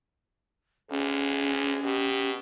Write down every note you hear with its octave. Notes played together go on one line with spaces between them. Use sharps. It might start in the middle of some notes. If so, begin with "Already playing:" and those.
D2 C#4 G#4
B2 G4